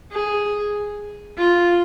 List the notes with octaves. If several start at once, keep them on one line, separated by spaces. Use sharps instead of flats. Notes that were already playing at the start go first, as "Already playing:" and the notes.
G#4
F4